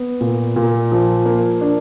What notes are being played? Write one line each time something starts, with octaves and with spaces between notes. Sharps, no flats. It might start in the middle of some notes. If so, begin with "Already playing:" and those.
Already playing: B3
A#2
A#2
F3
A#3
D4